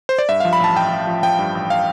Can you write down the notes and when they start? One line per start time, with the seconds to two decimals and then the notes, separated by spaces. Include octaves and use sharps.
0.09 C5
0.18 D5
0.29 G2 E5
0.40 F3 F5
0.53 B5
0.60 A1 A5
0.75 A1 G5
0.92 A1
1.07 F3
1.23 F3 G5
1.39 G2
1.55 A1
1.70 F5